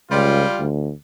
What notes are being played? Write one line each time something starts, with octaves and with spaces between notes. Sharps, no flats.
C#2 G3 F4
D2